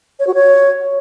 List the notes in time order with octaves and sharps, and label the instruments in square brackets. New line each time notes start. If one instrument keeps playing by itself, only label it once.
[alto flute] C#5
F#4
C#5